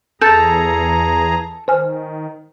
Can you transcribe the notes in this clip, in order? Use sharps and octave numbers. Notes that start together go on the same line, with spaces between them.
E2 G#4 A4 A#5 G6 A6
D#3 C5 G#5 F6